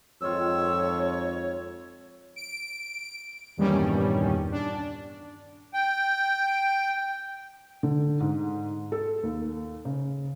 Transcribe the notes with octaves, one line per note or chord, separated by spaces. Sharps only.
F2 G#2 D#3 F4 C#5 E6
D7
E2 G2 A#2 D#3 G3 C#4
D4
G5
D3
G#2
A4
D#2
C#3